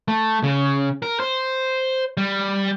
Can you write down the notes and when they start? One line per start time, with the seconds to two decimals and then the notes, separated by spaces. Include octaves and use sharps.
0.08 A3
0.44 C#3
1.02 A#4
1.20 C5
2.17 G3